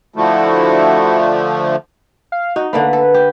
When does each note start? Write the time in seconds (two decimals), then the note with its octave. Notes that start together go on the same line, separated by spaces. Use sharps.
0.16 D3 F3 A3 E4 F#4 A4
2.32 F5
2.56 D#4 F#4
2.73 D3 A3 A#3 B4
2.93 A4
3.14 G4